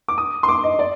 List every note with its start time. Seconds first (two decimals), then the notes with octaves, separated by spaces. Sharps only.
0.08 D6
0.18 D#6
0.43 C6
0.48 D6
0.64 D#5
0.79 D5